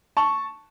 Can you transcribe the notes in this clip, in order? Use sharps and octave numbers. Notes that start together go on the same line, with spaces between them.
A5 C#6